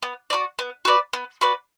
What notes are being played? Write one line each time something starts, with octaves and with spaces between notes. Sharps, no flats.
B3
F#4 B4 D5
B3
F#4 B4 D5
B3
F#4 B4 D5